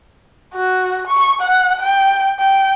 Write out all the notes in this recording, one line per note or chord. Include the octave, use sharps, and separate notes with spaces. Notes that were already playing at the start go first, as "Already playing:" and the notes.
F#4
C#6
F#5
G5
G5